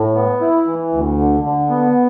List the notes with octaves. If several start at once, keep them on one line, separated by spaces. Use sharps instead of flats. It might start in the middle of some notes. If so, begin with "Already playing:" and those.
Already playing: A2
B3
E4
E3
D2
D3
D3
B3